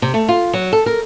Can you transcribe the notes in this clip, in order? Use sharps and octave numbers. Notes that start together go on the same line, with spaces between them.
C3
A3
F4
F#3
A4
A#4